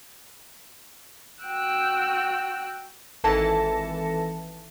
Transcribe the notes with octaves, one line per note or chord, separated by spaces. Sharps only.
F#4 G5 E6 F#6
G#1 E3 A4 A5 A#6 C#7